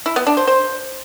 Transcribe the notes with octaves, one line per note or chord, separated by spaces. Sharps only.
E4
B3
D4
C5
C5